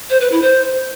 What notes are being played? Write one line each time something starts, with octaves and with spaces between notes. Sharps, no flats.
C5
B4
E4
C5